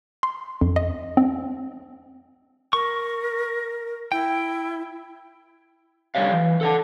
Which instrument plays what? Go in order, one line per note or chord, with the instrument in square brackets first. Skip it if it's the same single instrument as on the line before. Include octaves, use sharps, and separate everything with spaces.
[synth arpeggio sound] C6
F2
D#5
C4
[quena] A#4 [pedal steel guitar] C#6
[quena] E4 [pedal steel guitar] G5
[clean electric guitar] C2 D3 G3 C#5 F5
E3
A4 F#5 A5